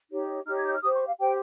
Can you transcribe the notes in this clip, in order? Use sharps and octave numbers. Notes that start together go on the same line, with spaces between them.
D#4 G4 C#5
D#4 G4 C#5 F6
G#6
G6
F6
G4 C5 D#6
C#6
F5
G4 C5 G5